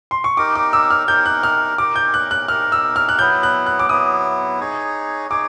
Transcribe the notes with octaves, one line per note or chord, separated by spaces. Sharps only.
C6
C#6
D#4 G4 A#4 D6
D6
E6
F6
D#4 G4 A#4 G6
F#6
F6
D#4 G4 A#4 D6
G6
F#6
F#6
D#4 G4 A#4 F6
E6
F6
F#6
F#3 B3 E4 G6
F#6
F#6
D6
F#3 B3 E4 D#6
D#4 G#4 C#5
D#4 G#4 C#5 D6